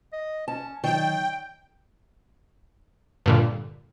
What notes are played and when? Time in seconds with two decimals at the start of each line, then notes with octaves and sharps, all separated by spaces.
0.13 D#5
0.48 C#4 A5
0.84 D#3 F#3 G5
3.26 G2 A#2 D3